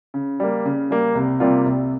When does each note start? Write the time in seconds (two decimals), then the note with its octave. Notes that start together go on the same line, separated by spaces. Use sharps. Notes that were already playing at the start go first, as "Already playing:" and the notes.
0.14 C#3
0.40 G3 A#3
0.65 C#3
0.91 G3 A#3
1.15 C2
1.40 C3 G3 A#3 F4
1.66 C2